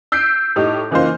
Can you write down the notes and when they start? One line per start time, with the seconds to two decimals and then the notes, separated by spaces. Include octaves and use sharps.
0.12 E6 G6 B6 C7 D7
0.56 A2 D#4 G4
0.91 C#3 E3 A#3 D#4 F4 C5